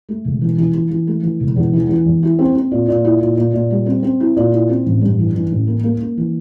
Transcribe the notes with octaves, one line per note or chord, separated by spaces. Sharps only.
A3
E1
E3
E3
E3
E3
A3
E3
E1
E2
E3
E3
E2
E4
C4
C4
A#2
A#2
E4
A#2
A#2
A#2
G3
C4
C4
E4
A#2
E4
C4
A1
G2
E3
E3
A1
A#3
A#3
A#3
E3